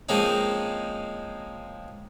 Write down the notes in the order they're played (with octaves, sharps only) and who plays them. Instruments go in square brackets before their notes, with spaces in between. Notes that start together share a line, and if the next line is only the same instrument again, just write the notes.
[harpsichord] F3 G#3 A#3 C4 C#4 D#4